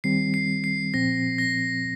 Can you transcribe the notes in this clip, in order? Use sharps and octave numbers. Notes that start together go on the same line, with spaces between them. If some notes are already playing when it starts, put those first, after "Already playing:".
D#3 G3 C4 C7
C7
C7
A#2 F3 C4 A#6
A#6